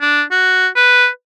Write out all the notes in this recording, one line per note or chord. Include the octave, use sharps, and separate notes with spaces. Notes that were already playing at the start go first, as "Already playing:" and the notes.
D4
F#4
B4